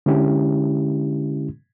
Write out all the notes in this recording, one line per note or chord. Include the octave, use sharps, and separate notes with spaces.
D3 G#3 C#4 E4 G4